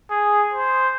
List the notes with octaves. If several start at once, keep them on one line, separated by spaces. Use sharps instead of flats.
G#4
C5